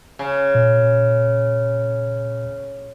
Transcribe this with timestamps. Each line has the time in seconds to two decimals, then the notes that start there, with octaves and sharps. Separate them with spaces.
0.19 C#3
0.55 A#2